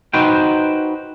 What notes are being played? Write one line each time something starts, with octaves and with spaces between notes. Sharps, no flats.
D#4 F#4 B4 C5 G5